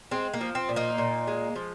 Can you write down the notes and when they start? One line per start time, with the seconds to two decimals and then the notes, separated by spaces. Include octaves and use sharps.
0.11 G#3 C4
0.34 A#3
0.41 F3
0.55 C4
0.69 A#2
0.76 A#3 D#4
0.98 A#2
1.27 G#3
1.56 F3